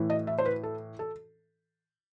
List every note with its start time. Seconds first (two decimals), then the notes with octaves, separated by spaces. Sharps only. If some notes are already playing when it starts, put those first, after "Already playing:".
Already playing: A2 E3
0.10 D#5
0.27 E5
0.38 C5
0.46 B4
0.63 A4
0.99 A4